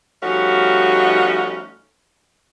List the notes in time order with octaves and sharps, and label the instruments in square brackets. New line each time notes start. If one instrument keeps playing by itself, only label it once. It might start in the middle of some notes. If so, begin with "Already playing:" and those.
[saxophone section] F3 G3 A3 C#4 D#4 F#4